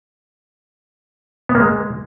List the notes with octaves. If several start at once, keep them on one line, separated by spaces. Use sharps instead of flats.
B3
A#3
G#3